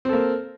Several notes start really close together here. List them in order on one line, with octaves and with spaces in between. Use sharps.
C4 A4 A#3